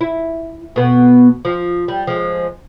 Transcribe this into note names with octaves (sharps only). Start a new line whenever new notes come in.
E4
B2 B3
F3
G3
F3 G#3